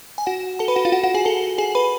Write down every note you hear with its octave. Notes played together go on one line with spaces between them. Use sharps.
G#5
F#4 F#5
A4 A5
B4 B5
F#4 F#5
F4 F5
F#4 F#5
F#4 F#5
G#4 G#5
A4 A5
G#4 G#5
B4 B5